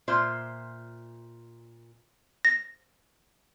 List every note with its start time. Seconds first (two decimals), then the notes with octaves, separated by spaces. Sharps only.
0.08 A#2 F4 C5 E5
2.45 A#6